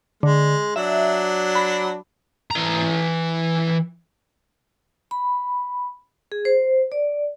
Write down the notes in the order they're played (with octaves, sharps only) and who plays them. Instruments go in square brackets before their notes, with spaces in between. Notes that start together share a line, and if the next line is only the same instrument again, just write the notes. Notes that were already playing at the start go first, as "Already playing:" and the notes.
[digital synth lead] D3 [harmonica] G#3
[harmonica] F#3 D4 [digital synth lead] E5
[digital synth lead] B5
[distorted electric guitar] E3 A#5
[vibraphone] B5
G#4
C5
D5